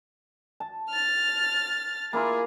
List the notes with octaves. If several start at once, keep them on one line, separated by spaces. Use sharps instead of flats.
A5
F6 A6
A#3 E4 F4 G#4